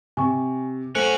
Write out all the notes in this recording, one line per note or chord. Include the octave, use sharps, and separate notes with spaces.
C3 G#5 C#6
A3 C#4 F#4 C5 F#6 D7 F#7